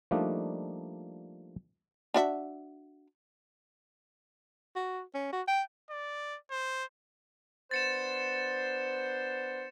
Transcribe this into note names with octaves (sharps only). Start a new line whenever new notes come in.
F3 G3 A3 A#3 D4 D#4
D4 F#4 E5
F#4
C#4
F#4
G5
D5
C5
B3 D4 C5 A6 C#7 E7